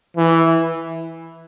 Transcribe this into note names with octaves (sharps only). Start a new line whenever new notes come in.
E3